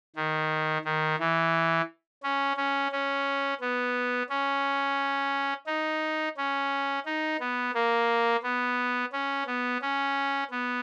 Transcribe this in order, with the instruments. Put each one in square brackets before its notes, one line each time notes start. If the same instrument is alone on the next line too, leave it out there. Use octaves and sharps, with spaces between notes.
[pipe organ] D#3
D#3
E3
C#4
C#4
C#4
B3
C#4
D#4
C#4
D#4
B3
A#3
B3
C#4
B3
C#4
B3